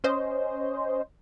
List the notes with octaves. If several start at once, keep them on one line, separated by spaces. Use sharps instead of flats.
C#4 C5 D#5